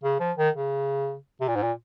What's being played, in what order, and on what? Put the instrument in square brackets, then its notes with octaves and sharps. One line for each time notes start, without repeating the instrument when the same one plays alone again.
[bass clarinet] C#3
F3
D#3
C#3
C3
A#2
G#2
A#2